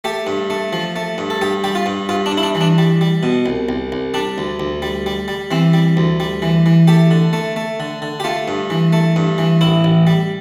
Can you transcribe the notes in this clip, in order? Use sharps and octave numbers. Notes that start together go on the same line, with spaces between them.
A3 G4
G2
A3
F3
A3
G2
A4
G2 G4
G3 G4
F4
G2
G2 F4
D4
G2
E4
D4
E3
D4
G3
G3
B2
C2
C2
C2
G3 D4
D2
D2
G3
G3
G3
E3 C4
G3
D2
G3
E3
E3
A3 G4
D3
A3
A3
D3
D3
G4
A3 F4
G2
E3
A3
G2
E3
A1 E4
A1
G3